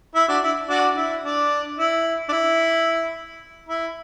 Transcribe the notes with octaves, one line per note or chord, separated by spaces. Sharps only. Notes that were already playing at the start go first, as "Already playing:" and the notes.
E4
D4 F#4
E4
D4 F#4
E4
D4
E4
D4
E4
E4